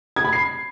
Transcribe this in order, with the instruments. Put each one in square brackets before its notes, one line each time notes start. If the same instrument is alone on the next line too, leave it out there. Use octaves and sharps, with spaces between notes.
[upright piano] G#6
B5
C7